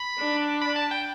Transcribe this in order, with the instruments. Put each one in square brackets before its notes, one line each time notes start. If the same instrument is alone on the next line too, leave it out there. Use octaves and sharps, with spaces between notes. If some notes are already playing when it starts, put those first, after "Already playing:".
Already playing: [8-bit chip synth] B5
[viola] D4
[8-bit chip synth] B5
A5
G5